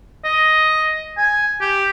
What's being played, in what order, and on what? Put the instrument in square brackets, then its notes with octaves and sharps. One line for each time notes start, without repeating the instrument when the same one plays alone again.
[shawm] D#5
G#5
G4